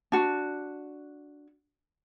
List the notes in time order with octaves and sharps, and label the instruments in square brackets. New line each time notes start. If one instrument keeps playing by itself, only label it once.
[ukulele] D4 F#4